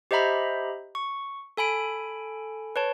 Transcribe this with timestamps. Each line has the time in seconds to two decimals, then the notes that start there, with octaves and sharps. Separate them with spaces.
0.11 G4 C5 D#5 E5 A#5 B5
0.95 C#6
1.57 A4 G#5 B5 D7
2.76 B4 C#5 A5